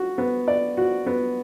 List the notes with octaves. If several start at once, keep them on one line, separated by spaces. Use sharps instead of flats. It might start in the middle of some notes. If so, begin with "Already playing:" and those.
Already playing: F#4
B3
D5
F#4
B3